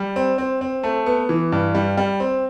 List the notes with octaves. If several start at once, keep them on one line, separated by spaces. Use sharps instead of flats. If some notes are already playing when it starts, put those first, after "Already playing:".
Already playing: G3
C4
C4
C4
A3
B3
E3
G2
G3
G3
C4